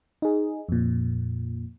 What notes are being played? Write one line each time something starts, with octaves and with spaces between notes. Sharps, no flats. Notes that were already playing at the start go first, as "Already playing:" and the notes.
D#4 G#4
F2 A#2